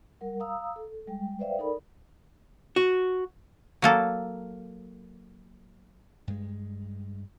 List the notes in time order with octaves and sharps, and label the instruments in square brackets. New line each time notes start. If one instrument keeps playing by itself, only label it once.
[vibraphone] G3 A#4 F#5
F5 A#5 D#6 E6
A4
G3 G#3 G5
B4 C5 D5 E5 F5 G5
D#4 A4 A#4 D5 B5
[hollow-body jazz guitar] F#4
[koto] F#3 A#3 A4
[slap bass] G2 G#3